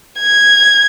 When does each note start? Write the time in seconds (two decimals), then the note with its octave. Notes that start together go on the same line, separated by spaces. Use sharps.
0.20 G#6